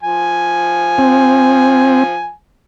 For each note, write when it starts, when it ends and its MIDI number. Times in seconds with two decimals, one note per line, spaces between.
0.03 2.31 53
0.03 2.31 80
0.98 2.04 60